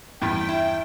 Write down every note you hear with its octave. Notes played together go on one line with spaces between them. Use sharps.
E2 G2 G5
E4